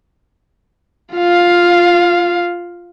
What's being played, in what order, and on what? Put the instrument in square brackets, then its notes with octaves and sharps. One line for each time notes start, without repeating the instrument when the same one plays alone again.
[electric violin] F4 F5